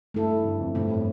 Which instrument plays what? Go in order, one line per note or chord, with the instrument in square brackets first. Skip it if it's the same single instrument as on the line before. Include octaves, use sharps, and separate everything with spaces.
[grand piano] G2 [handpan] A3 E4 A4
[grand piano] G2
F2
[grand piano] G2 [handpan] B2 A3 C4
[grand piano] A2